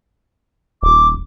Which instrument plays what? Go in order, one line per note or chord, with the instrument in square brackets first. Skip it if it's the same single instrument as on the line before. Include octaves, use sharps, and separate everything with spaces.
[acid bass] D#1 [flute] D6